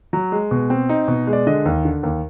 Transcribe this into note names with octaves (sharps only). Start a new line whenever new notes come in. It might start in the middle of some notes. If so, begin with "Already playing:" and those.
F#3
G#3
B2
C4
D#4
B2
G#3
D5
D3 D#5
D#2
D3
D#2